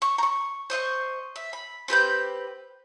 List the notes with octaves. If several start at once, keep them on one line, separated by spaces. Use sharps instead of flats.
C#6
A#5 C#6
C5 D#5 E5 C#6
E5
B5
C4 G4 B4 G6